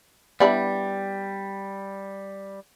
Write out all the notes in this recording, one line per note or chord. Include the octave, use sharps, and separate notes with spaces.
G3 B3 D4 E4